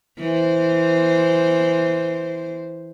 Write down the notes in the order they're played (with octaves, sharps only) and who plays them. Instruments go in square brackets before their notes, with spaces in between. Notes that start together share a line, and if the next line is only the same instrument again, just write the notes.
[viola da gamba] E3 C5